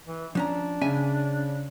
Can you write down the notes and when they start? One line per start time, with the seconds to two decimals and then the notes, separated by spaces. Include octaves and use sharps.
0.07 E3
0.35 F3 C#4 D4 A#5
0.81 C#3 C#4 E5 G#5